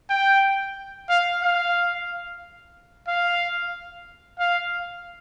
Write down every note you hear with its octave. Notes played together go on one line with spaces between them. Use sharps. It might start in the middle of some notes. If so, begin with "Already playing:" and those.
G5
F5
F5
F5
F5